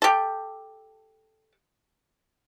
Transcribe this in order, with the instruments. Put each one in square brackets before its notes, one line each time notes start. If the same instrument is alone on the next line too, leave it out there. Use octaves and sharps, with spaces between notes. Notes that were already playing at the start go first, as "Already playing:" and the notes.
[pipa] G4 A4